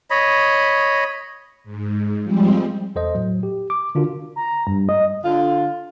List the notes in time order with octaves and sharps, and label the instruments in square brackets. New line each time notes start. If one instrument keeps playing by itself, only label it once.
[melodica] C#5 D#5 B5
[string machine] G#2
F3 G3 G#3 C4
[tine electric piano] E2 A4 C5 D#5
A2 F#3
G4
D6
D3 D4 F4 F#4 A#4
[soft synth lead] A#5
G2
D#5
[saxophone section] D3 F4